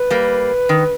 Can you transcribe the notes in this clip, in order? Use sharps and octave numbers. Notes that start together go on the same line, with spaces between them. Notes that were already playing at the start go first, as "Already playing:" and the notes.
Already playing: B4
G3 A#3
D#3